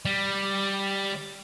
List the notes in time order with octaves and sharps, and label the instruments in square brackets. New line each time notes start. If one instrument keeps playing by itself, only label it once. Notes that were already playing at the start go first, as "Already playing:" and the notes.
[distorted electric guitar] G3